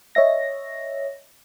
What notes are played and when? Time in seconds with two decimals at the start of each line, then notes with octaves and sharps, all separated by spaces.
0.15 C#5 D#5 E5 A#6